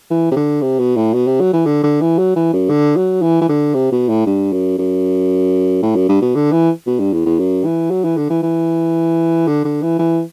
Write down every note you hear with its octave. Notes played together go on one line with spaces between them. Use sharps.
E3
C3
D3
C3
B2
A2
B2
C3
F#3
E3
D3
D3
E3
F#3
E3
F#2
D3
F#3
E3
E3
D3
C3
B2
A2
G2
F#2
F#2
A2
F#2
G2
B2
D3
E3
B2
G2
E2
E2
F#2
E3
F#3
E3
D3
E3
E3
D3
D3
E3
E3